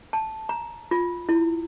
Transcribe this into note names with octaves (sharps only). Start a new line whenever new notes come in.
A5
A#5
F4
E4